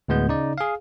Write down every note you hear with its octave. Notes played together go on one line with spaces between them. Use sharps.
D2 A2 G#3 B3 G6
C#3 D#4 D5
G#4 F5